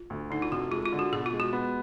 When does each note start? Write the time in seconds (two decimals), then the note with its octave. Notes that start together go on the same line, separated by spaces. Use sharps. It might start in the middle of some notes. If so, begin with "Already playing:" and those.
Already playing: F4
0.10 D2
0.31 D3 D#4
0.42 F4
0.51 F1 F#4
0.72 G#3 F4
0.86 F4
0.93 D3
0.99 F#4
1.12 B2 G#4
1.26 F4
1.33 G#3
1.40 F#4
1.53 B3